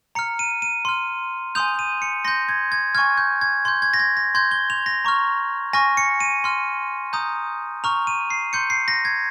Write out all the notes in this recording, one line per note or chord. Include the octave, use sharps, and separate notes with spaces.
A#5 F6 C#7
D#7
D#7
C6 F6
G#5 C6 D#6 G6 F7
D#7
C#7
C6 G6 A#6
G#6
G#6
G#5 C#6 F6 G#6
G6
G#6
C6 G6 G#6
G#6
A#6
G#6
A#6
C6 G6 G#6
G7
F7
A#6
A#5 C#6 F6
G#5 C#6 F6 A#6
C#7
D#7
C6 F6
A#5 D#6 G6
A#5 C#6 F6 F7
D#7
C7
C6 G6 C#7
C7
A#6
G#6